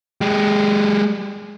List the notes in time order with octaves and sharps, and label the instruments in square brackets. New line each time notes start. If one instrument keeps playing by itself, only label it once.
[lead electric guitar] G#3 G4